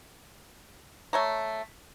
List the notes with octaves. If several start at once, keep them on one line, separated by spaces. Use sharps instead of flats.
A3 C#5 A#5